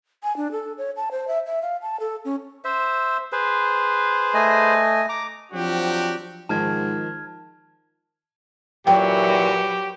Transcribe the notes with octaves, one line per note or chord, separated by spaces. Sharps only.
G#5
D4
A4
C#5
A5
C5
E5
E5
F5
A5
A4
C#4
C5 E5
G#4 B4 C5
A3 D#5 G#5
A#5 D6
F3 F#3 C4 D4 F#4 G4
G#2 D#3 F3 A5 F6 G#6
A#2 E3 F#3 F#4 G4 B4 G5